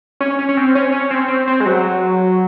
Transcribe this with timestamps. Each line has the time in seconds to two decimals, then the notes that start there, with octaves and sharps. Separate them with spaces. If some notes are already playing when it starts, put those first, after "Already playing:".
0.20 C#4
0.39 C#4
0.49 C#4
0.57 C4
0.75 C#4
0.92 C#4
1.11 C4
1.28 C4
1.47 C4
1.60 G#3
1.65 F#3